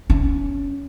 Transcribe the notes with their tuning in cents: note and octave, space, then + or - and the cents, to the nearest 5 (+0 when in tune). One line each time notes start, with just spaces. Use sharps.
C#4 +20